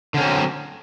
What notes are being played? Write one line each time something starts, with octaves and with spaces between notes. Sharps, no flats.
D3 F#3 C4 C#4